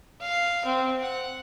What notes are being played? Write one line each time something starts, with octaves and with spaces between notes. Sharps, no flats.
F5
C4
F#5